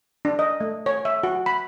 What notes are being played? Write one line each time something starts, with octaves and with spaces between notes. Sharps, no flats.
D4
D#5
A3
C#5
E5
F#4
B5